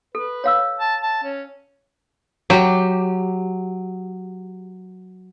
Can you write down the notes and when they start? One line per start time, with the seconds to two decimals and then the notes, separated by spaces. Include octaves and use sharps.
0.15 A4 B4
0.44 C#5 F5 E6
0.80 A5
1.03 A5
1.24 C#4
2.50 F#3 G4